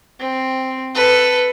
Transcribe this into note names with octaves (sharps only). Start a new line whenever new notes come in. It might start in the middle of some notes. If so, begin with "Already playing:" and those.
C4
A4 B4